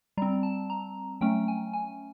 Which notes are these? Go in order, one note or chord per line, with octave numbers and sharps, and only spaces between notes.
G3 C4 A#5
A5
A#5
F#3 A3 C#4 G5
G#5
G#5